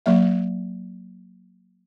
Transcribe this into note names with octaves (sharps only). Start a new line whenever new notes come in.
F#3 A#3 E5